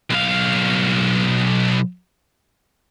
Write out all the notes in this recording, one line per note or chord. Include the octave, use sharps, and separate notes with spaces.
B1 F5